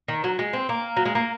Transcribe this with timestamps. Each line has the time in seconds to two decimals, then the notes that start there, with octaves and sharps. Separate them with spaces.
0.08 D#3
0.24 F#3
0.39 G#3
0.53 C4
0.69 A#3
0.97 F#3
1.06 G#3
1.15 A#3